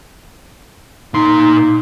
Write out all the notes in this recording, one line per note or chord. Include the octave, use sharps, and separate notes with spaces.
A#2 D#4 C6